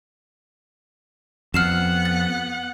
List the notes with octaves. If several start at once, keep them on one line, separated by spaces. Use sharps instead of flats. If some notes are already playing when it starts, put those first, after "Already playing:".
F2 B3 F#5 F6 C7 E7
A6